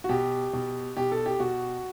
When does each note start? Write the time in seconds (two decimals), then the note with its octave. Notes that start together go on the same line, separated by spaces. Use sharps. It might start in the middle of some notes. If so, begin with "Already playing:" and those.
0.04 F#4
0.09 B2 G4
0.53 B2
0.97 B2 G4
1.12 A4
1.26 G4
1.40 B2 F#4